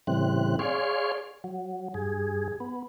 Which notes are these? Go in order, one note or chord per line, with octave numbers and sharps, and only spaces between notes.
A2 C#3 E3 G3 C4 F#6
G#4 C#5 D5 F5 C6 C#6
F#3
G2 G#4
B3